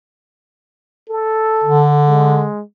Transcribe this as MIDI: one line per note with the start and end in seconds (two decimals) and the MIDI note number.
1.10 1.89 69
1.64 2.47 50
2.07 2.62 56